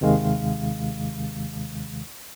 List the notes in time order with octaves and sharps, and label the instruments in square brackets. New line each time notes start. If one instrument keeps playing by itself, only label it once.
[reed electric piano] D#2 C3 D#3 G#3 F5